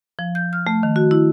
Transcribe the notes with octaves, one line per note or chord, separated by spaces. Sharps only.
F3
G6
F6
A3
D#3
F#4
E4